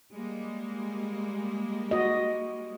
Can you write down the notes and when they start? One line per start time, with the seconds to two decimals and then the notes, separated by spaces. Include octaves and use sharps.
0.12 G3 G#3 A#3
1.91 F#4 D#5